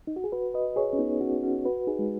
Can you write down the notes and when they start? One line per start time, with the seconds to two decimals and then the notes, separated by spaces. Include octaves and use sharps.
0.07 D#4
0.16 F#4
0.24 G#4
0.32 F#4 B4
0.54 B4 D#5
0.76 G#4 C#5
0.93 C#4
0.99 B3 D#4
1.21 C#4 F#4
1.43 C#4 F#4
1.65 F#4 B4
1.87 D#4 G#4
1.99 G#3